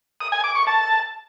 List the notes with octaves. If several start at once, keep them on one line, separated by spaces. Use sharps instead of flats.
D#6
G#5
D6
C#6
A5